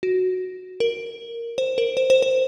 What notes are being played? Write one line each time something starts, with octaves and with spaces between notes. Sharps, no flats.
F#4
A#4
C5
A#4
C5
C5
C5